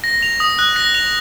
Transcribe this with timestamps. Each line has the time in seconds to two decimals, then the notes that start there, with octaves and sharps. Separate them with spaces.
0.04 A#6
0.23 F7
0.40 D#6
0.59 F#6
0.76 A#6
0.95 F7